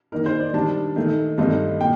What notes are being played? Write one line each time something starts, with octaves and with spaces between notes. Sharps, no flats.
D#3 A#3 D#4 A#4
C5
D5
D#3 G3 D4 A5
D#3 A3 D#4
G2 D#3 A3 C4 D#4
A#2 G5